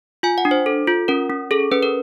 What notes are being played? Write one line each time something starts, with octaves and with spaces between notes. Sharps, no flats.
F4 G#5
F#5
D4
C5
A4
F4
C#4 A#4
C#4
G#4 A4
C#4 B4
A#4